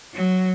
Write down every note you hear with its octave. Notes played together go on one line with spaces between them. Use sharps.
F#3